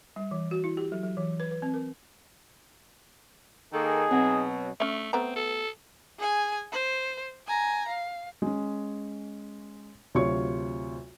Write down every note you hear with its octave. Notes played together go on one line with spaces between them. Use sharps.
G3
E3
F#4
E4
G4
F#3
F#3
E3
B4
B4
C4
A#4
D#3 A#3 D#4 G#4 A4
B2 F#3 C4
A3 C#4 E5
A3 B3 C4 A#5
A4
G#4 G#5
C5
G#5 A#5
F5
G#3 C#4
D2 C3 F#3 F4 C#5 C#6